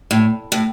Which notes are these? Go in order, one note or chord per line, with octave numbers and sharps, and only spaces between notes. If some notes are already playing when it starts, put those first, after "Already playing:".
A2
A2